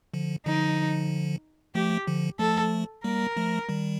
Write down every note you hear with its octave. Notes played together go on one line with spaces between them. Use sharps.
D3 F3
D3 F3 D#4
F3 A3 G4
D3 F3
F3 A3 A4
G3 A#3 A#4
F3 A3
D#3 G3